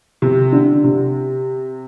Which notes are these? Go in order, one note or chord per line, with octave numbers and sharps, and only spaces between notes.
C3
D3
C3